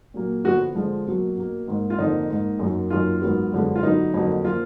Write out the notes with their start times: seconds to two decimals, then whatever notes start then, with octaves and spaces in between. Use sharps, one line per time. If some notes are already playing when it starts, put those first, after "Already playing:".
0.14 A#2 F#3 A#3
0.44 D3 F3 B3 F#4
0.75 D3 F3 G#3
1.07 B2 F#3 A#3
1.37 B2 A#3
1.67 G#2 D#3 A#3
1.90 F4
1.98 F2 D3 F3 A#3 D#4
2.30 G#2 D#3 A#3
2.59 F#2 D#3 F#3 A#3
2.90 F#2 D#3 A#3 F4
3.22 G#2 D#3 F#3 B3
3.53 F#2 D3 F3 G#3 B3
3.76 F4
3.83 D3 F#3 B3 D#4
4.14 F2 D3 F#3 A#3
4.44 F3 A#3 F4